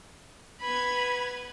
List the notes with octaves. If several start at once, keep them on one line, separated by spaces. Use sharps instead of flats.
B3 B4 B5 G#6